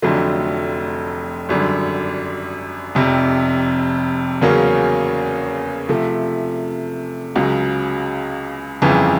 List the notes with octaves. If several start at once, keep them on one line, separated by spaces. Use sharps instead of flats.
F1 F2 D3 F#3 A3
G#1 F#2 D3 G3
F1 F2 C3
E2 C#3 F#3 A#3 C#4
C3 F3 A3
C#2 C#3 F#3
G1 F2 C#3 E3